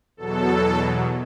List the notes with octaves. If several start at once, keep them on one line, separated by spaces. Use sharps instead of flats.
E2 B2 F#3 A4